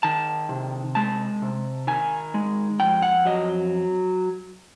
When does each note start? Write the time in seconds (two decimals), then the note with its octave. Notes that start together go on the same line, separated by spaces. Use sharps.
0.03 D#3 A5
0.49 C3
0.95 G#3 A5
1.42 C3
1.87 D#3 G#5
2.34 G#3
2.80 F2 G5
3.02 F#5
3.25 F#3 D#5